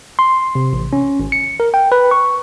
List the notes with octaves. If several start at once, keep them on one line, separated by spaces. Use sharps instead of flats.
C6
C3
A1
C#4
G#1
C#7
A#4
G5
B4
C#6